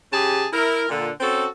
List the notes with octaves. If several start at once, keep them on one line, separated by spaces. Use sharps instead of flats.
C#3 G4 G#4 G#5 A5
E4 A#4
A#2 D3
C4 C#4 F#4 A4